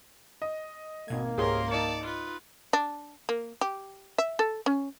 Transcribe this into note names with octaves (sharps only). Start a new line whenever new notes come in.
D#5
G#1 B2 A#3 G#6
C#2 G#2 G4 G#4 A#4 C#5 C6
D#4 D5 A5 C#7
F4 B4
D4
A#3
G4
E5
A4
C#4